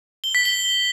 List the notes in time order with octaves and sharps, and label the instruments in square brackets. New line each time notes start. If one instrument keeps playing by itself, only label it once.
[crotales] G7
B6
G7